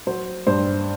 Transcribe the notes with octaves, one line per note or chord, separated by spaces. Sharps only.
F#3 C5
G2 C5